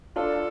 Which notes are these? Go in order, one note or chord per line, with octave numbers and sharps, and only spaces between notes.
D4 F4 A4